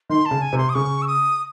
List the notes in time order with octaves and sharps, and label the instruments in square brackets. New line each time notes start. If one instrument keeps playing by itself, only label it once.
[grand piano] D#3 [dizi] C6
[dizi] A5
[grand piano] C#3
[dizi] G#5
[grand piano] C3
[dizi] C6
D#6
[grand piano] C#3 [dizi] C#6
[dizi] E6
D#6